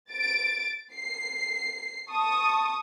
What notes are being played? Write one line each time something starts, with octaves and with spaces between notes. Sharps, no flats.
A6 D7
C7
A5 C#6 D#6